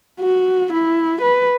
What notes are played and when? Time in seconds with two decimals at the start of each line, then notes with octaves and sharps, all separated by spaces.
0.20 F#4
0.73 E4
1.22 B4